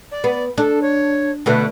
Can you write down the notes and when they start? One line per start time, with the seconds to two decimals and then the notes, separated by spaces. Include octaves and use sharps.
0.11 D5
0.24 B3
0.58 D4 A4
0.82 C#5
1.46 B2 D3 A3 B4